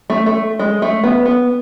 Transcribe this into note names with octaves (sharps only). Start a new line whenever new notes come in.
A3
A3
G#3
A3
B3
B3